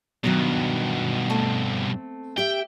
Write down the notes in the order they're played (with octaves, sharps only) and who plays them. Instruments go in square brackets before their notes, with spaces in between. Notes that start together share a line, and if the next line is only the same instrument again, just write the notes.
[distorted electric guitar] G2 B2 [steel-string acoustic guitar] D#3 F#3 B3
[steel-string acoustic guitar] A3 C4
[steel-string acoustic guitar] G4 E5 [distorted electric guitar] G5